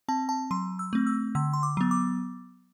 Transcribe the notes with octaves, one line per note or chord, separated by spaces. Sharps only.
C4 A5
A5
F#3 C6
E6
A3 C4
E6
D3 E6
C6
D6
F#3 B3
D6